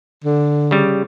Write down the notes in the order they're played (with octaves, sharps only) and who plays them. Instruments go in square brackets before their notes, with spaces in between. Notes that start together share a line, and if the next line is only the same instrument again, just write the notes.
[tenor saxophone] D3
[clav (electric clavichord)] C#3 G3